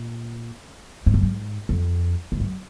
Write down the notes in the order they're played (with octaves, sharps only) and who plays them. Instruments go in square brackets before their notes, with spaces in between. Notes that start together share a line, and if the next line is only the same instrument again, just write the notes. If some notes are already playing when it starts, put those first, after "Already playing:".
Already playing: [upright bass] A#2
G#2
F#2
G#2
F2
G#2
F#2